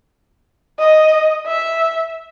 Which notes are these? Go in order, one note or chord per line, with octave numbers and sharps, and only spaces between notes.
D#5
E5